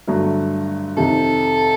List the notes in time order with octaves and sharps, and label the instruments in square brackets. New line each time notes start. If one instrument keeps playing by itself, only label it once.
[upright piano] G2 D3 F#3 A3
[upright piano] F2 C3 D#3 [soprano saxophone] A4